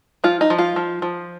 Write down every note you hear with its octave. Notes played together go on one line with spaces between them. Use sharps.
F3 F4
D#4
F3
F4
F3
F3